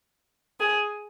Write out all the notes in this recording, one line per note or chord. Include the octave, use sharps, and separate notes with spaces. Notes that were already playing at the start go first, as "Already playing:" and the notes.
G#4